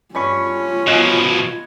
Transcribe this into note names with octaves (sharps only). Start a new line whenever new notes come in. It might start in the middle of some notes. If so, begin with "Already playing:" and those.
G2 C#4 F4 B5 C#6
B2 F3 D#5 F#5 G#5